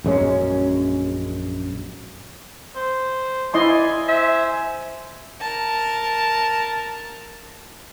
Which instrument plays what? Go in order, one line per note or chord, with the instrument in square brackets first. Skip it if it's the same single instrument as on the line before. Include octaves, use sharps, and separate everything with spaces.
[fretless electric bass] A#1 F#2 G#3 C#4
[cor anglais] C5
[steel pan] E4 D#5 C6 [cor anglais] D5 [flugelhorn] G#5
[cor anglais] C5 [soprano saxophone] E5
[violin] A#4 A5